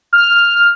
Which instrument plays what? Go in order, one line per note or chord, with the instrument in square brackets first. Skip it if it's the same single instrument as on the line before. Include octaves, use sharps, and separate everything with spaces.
[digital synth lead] F6